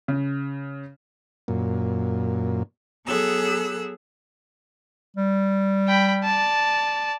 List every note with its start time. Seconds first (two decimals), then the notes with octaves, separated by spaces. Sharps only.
0.08 C#3
1.48 F#2 A#2
3.06 F#3 B3 G#4 A4 E6 F#6
5.16 G3
5.88 G5 B5
6.24 D5 A5